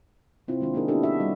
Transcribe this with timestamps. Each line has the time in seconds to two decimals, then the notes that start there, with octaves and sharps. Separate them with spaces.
0.48 C3 C4 E4 F4
0.60 D#3 G#3 D4 F4
0.74 A#3 D4 D#4 G#4 A#4
0.88 B3 D4 E4 F#4 G4 A4
1.03 F#4 E5
1.20 G3 D#5